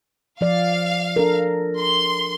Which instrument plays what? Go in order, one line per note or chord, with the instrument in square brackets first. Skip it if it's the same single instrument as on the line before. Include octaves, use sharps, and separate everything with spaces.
[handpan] F3 D5 [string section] F5
[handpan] D4 A4 A#4
[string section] C6